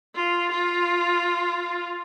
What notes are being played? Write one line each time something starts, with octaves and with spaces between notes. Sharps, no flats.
F4
F4